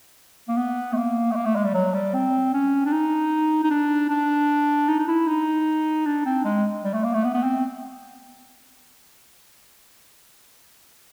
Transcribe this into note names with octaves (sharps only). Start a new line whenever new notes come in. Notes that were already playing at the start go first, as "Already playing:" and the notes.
A#3
B3
A3
A#3
A3
A#3
A3
G#3
G3
F#3
G3
C4
C#4
D4
D#4
D#4
D4
D4
D#4
D#4
E4
D#4
D4
C4
G#3
G3
A3
A#3
A3
B3
B3
C4